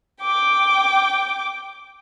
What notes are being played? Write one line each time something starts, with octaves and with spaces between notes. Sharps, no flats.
G5 D6